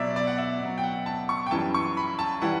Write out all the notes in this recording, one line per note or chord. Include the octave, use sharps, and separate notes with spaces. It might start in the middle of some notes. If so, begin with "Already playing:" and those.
Already playing: B2 F#3 D5 E5
D5
F#5
E5
B2 F#3
G5
F#5
A5
C#6
G5
F#2 E3 G3 A5
C#6
B5
A5
E3 G3 F#5